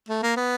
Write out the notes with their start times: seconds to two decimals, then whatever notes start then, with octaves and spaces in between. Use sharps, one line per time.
0.09 A3
0.23 A#3
0.36 B3